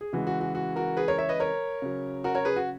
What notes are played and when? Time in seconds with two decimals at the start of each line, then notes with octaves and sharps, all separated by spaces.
0.01 G#4
0.13 C#3 E3 G#3 F#4
0.27 F#4
0.41 F#4
0.55 F#4
0.76 F#4 A#4
0.97 G#4 B4
1.08 A#4 C#5
1.18 C#5 E5
1.29 B4 D#5
1.40 A#4 C#5
1.82 C#3 F#3
2.24 F#4 A#4
2.35 A#4 C#5
2.45 G#4 B4
2.56 F#4